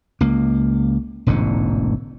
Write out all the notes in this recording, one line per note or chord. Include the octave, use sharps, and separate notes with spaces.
C#2 A#3
E1 A1 G#2 D3